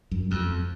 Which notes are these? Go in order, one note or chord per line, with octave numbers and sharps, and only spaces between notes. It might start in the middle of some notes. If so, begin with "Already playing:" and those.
F#2
F2